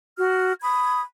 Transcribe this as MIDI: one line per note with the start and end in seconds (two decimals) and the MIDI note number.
0.18 0.53 66
0.18 0.53 89
0.62 1.00 83
0.62 1.00 87
0.62 1.00 92